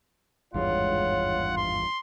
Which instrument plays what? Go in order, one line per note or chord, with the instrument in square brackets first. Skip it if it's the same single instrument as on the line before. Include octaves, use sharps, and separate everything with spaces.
[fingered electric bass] G#1 E2 G2 [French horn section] G#3 C#5 [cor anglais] F4 [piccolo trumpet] F#5
[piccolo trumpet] C6